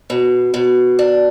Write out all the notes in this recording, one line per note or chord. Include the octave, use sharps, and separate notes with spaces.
B2
B2
D4